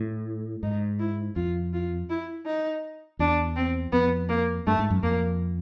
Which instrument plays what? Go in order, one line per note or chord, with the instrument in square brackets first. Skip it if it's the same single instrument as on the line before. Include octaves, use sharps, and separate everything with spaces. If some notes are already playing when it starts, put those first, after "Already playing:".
Already playing: [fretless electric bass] A2
[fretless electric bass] G#2 [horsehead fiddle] D#4
[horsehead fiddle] E4
[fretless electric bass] F2 [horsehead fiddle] F4
[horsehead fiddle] F4
E4
D#4
[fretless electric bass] E2 [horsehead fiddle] D4
[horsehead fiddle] C4
[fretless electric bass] F2 [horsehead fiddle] B3
[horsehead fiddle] A#3
[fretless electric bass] G2 [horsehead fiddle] A3
[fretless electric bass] G#2
F#2
[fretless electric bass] F2 [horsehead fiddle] A#3